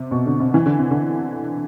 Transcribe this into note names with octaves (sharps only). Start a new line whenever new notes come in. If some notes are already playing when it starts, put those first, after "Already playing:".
Already playing: C3
B2
D3
C3
E3
D3
C3
D3